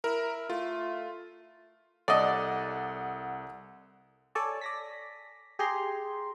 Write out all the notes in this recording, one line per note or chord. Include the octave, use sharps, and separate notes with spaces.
E4 A#4
A3 F4
C2 A4 D5 D#5 F#5
A4 C#5 D5 G#5 A5
D5 A#6 B6
G4 G#4 A#5 C6